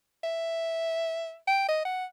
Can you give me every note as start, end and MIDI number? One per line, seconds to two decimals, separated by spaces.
0.23 1.36 76
1.47 1.66 79
1.69 1.81 75
1.85 2.05 78